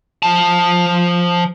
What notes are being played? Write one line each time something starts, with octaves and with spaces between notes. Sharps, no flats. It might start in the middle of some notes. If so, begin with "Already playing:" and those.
F3 A5